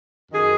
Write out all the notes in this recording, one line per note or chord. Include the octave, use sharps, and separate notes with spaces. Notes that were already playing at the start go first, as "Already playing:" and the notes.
F#2 D#3 G#4